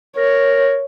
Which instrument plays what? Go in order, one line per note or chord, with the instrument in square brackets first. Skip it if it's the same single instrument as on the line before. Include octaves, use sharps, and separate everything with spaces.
[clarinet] A#4 [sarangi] C#5